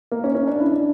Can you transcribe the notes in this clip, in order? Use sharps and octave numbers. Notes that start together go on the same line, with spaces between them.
A#3
C#4
C#4
D4
E4
D4